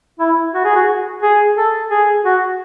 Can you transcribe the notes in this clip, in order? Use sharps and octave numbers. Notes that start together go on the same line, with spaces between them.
E4
F#4
G#4
F#4
G#4
A4
G#4
F#4